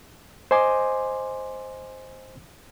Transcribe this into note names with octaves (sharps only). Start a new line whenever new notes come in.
C5 D#5 G#5 C6 D6